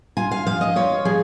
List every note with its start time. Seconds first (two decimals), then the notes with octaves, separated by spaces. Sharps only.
0.17 F4 G#5
0.31 F5
0.46 F3 F5
0.61 D#5
0.76 F4 C#5
1.05 F3 G#4